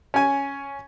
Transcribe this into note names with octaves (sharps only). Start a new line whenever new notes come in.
C#4 G#5